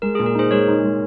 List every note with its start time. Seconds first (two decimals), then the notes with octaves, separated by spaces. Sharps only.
0.02 G#3 A#4
0.15 G#4
0.19 A#2
0.26 A#4
0.35 D#4 G#4 C5
0.51 G#3 A#4 C#5
0.68 D#4
0.84 G#3